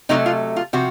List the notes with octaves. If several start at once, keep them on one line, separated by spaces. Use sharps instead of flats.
C3 F#3 A3 D#4
F4
F4
C3 F3 F#4